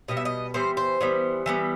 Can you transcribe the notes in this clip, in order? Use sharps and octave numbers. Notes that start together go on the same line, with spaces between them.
B2 G3 B3 D#5
E5
D#5
E3 G3 B3 C5
C5
E3 G3 B3
E3 G3 B3